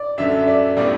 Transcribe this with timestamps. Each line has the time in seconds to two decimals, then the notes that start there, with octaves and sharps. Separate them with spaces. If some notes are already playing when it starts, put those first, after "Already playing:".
Already playing: D5
0.18 F#2 D3 A3 E5
0.47 D5
0.77 A2 G3 B3 E4 D5